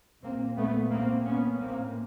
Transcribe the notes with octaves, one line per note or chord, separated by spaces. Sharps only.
A#2 A#3 C4
A3 B3
A#3 C4
B3 C#4
A2 A#3 C4